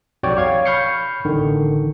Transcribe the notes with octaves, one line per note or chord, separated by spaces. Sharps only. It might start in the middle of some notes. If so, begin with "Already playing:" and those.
B1 F2 F#4 C#5 D5 G5
C#5 F5 G#6
B5 C#6 F6 G6 C7 C#7
A1 D3 D#3